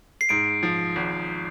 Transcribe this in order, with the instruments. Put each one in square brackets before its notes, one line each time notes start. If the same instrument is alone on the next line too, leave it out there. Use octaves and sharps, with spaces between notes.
[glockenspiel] C7
[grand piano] G#2 [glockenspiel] D7
[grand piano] F3
G#1